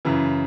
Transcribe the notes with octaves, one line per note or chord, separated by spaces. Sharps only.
F#2 C#3 E3